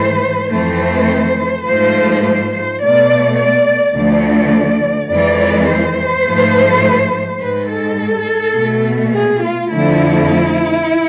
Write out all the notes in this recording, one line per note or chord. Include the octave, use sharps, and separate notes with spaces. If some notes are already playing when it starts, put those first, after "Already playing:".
Already playing: G#2 E3 A3 C5
F2 E3 A3 C5
G#2 F3 A3 C5
C5
C5
B2 A3 D5
D5
D2 D3 F3 A3 D5
F2 E3 G#3 D5
C5
G#2 F3 A3
G#2 G#3 B4
A4
B2 A3
G#4
F4
F2 D3 F3 A3 E4